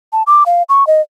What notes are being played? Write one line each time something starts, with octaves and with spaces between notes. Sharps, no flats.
A5
D6
F5
C#6
D#5